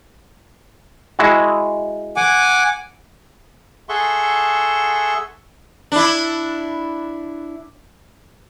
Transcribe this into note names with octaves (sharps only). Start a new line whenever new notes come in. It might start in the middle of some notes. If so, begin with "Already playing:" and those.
G#3 E4 F#4
F#5 G#5 D6
G#4 A4 E5 F#5 C6 C#6
D4 E4